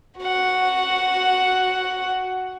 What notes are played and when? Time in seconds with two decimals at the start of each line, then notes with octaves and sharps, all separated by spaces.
0.18 F#4 F#5